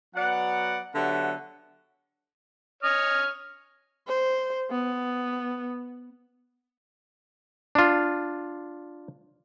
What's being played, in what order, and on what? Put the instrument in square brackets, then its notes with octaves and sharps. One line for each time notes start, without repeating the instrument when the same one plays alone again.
[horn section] F#3 B3 D5 F#5
D3 F#3 B3 G4 E5 F#5
[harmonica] C#5 F6 [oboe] D#5
[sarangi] C5
B3
[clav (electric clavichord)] D4 F4